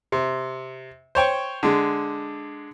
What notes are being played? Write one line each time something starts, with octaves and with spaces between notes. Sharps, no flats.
C3
C5 C#5 G5 C#6
D3 G#3